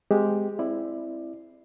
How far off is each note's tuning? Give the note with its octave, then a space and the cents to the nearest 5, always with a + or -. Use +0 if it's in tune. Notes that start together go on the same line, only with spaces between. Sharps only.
G#3 +0 C4 -40 G4 +0
C4 +0 E4 +5 D5 +20